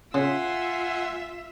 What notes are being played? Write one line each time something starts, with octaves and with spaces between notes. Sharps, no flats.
C#3 F4 E5 F#5 G#5 C6